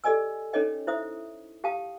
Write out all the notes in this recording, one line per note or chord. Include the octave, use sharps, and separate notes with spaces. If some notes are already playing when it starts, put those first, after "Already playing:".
G4 A4 D5 D#5 G#5 E6
C#4 D#4 A4 C#5 D#5 G5
E4 C5 E5 D#6
G4 F5 G5 A5 D#6